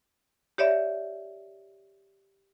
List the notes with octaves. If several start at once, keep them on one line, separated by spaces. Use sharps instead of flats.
G4 C#5 D5 E5